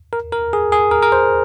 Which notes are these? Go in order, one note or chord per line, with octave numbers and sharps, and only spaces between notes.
A#4
A#4
G#4
G#4
A#4
A#4
C5